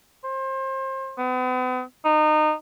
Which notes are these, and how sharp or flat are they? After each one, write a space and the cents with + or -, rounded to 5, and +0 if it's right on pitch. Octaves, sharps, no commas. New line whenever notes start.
C5 +30
B3 +45
D#4 -25